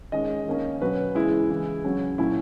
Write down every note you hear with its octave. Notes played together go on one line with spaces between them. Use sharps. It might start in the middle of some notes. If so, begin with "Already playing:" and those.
D#3 G#3 C#4 D#5
D#3 A#3 C#4
B2 F#3 C#4 B4
C#3 E3 G#3 E4
C#3 E3 G#3
C#3 F#3 C#4
A#2 F#3 C#4 E4